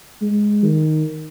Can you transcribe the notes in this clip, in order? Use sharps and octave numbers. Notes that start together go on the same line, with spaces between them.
G#3
D#3